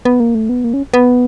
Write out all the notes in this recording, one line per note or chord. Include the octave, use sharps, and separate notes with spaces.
B3
A#3
A3
B3
A#3
C#4
B3